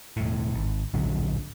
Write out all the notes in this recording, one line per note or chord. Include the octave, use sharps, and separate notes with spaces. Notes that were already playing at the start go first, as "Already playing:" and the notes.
E1 A2
G#1
D1 A#1 D3 F#3